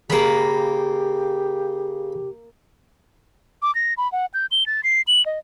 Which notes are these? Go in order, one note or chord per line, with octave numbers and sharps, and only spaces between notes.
C#3 A#3 G4 C#5 B5
D6
A#6
B5
F#5
G6
G7
A6
C7
F#7
D#5